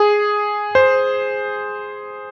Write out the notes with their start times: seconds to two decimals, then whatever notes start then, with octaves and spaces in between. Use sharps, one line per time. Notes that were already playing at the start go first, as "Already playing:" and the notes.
Already playing: G#4
0.75 C5